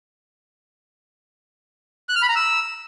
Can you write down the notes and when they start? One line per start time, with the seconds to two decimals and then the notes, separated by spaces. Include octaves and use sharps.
2.09 F#6
2.16 F6
2.22 B5
2.29 A#5
2.36 E6